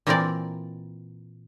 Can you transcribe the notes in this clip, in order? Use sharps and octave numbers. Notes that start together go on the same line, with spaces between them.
A#2 E3 A#3 C4 A#4 D5